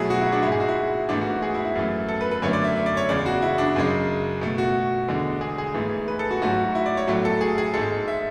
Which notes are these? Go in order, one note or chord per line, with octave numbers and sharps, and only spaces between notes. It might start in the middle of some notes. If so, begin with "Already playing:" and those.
Already playing: B2 F#3 A3 E4 G#4
F#4
E4
D4
G#2 G#3 E4
G#4
F#4
E4
G#2 E3 A3 D4
F#4
G#4
E4
E4
F#2 E3 A3
A4
B4
B4
F#2 D3 A3 C#5
D5
E5
E5
D5
C#5
E2 C#3 G#3 D5
F#4
E4
D4
F#2 C#3 G#3
B2 A3
F#4
E2 D3 G#3
G#4
G#4
G#2 E3 A3
B4
A4
F#4
G#2 F#3 A3 F#4
E4
D5
C#5
A2 F#3 A3
A4
G#4
G#4
G#2 G#3 A4
E5